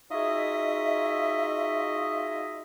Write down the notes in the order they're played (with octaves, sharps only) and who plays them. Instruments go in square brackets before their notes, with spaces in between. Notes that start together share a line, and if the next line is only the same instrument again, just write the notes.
[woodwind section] D#4 F4 F#4 G#4 D#5 E5